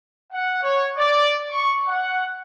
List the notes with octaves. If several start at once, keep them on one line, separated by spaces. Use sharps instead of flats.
F#5
C#5
D5
C#6
F#5